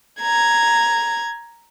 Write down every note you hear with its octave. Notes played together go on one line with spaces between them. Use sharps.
A#5 G#6